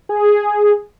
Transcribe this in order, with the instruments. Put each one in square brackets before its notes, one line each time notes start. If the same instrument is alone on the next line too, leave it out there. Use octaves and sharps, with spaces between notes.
[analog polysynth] G#4